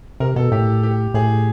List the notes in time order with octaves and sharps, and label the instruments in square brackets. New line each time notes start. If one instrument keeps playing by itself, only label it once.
[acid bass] C3 [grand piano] A#4
[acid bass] B2 [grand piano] A4
[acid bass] A2 [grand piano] G4
[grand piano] G4
[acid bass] A2 [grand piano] G#4